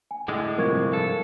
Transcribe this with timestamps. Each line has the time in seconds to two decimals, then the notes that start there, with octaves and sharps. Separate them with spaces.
0.11 G#5
0.28 A2 D3 G#3
0.58 G2 C3 F3 A#4 C#6 G#6
0.93 A4